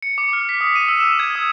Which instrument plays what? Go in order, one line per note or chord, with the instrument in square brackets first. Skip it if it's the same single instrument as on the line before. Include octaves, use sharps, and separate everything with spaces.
[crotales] C#7
D6
F6
B6
D#6
D#7
E6
E7
G#6
D#6